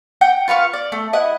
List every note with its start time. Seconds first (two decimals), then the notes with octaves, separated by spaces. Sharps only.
0.21 F#5 G5 G6
0.48 F4 B4 F5 C#6
0.73 D5
0.92 A3
1.13 E4 D#5 F#5